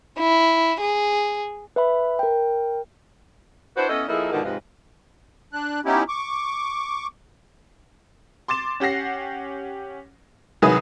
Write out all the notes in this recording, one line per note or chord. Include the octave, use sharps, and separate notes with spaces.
E4
G#4
B4 E5 B5
A#4 G5
D4 E4 F#4 B4 C5
B3 C#4 E4 A4 D#5
F3 A#3 D#4 E4 G#4 A4
G#2 B2 D3 D#3 F3
G#2 C3 F3 F4 B4 D#5
D4 F#6
B3 C#4 D#4 E4 G4
C#6 D6
C6 D6 A6 E7
C#4 G4 F#5 A#6 C7
C2 D#3 F#3 G#4 B4 D#6